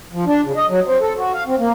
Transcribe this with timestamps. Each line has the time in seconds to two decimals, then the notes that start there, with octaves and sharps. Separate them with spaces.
0.12 F3
0.27 D4
0.44 C#3
0.57 D#5
0.69 F#3
0.86 C4
1.01 A4
1.18 F#4
1.34 F5
1.47 C4
1.59 A#3